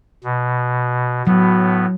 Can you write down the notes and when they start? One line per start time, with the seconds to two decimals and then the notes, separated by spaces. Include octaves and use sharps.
0.24 B2
1.27 A2 F#3 B3